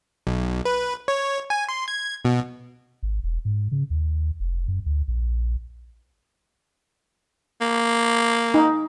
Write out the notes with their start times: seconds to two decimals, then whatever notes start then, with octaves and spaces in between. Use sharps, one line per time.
0.27 B1
0.65 B4
1.08 C#5
1.50 G#5
1.69 C6
1.88 G#6
2.25 B2
3.03 G#1
3.23 E1
3.45 G#2
3.72 C#3
3.90 D#2
4.40 F1
4.68 F#2
4.86 D2
5.08 A#1
7.61 A#3
8.54 D#4